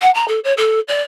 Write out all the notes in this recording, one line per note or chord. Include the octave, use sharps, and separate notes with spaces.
F#5
A#5
A4
C#5
A4
D5